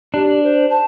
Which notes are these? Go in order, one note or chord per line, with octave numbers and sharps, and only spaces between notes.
D4 G4
C5
A5